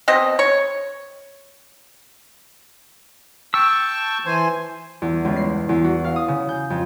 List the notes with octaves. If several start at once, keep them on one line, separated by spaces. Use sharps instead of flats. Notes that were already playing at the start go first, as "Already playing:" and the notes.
B2 C4 D#5
C#5
G5 A5 C#6 E6
E3 C5 G#5
E2
C#2
C7
E2
F#4
F5
D#6
C#3
G6
F2